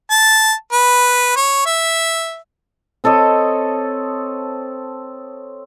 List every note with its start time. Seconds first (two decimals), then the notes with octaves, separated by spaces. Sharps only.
0.10 A5
0.72 B4
1.36 C#5
1.66 E5
3.04 C4 A4 C#5 D#5